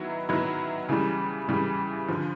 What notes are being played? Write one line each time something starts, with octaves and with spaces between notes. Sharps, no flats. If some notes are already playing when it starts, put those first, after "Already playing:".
Already playing: D#3 F#3 B3 E4
D#3 F#3 B3 E4
C#3 E3 G3
C#3 E3 G3
D3 F3